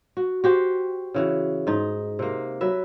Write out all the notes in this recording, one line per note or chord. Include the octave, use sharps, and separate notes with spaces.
F#4
F#4 G4 C5
C#3 E3 F#4
G#2 D#4
C3 A#3
F#3 B4 E5